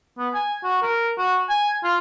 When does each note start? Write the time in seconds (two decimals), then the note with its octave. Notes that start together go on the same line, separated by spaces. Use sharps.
0.18 B3
0.34 G#5
0.64 F#4
0.82 A#4
1.18 F#4
1.49 G#5
1.84 F4